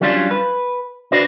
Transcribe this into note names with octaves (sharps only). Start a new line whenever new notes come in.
F#3 G3 C#4 D4 F4
B4
D4 F#4 B4 C5 D5